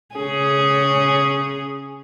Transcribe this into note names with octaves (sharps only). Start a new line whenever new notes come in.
C#3 C#4 G#4